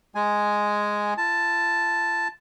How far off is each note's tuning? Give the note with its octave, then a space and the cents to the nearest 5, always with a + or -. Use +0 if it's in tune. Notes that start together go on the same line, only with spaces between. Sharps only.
G#3 +0 G#5 +0
F4 -40 A5 +0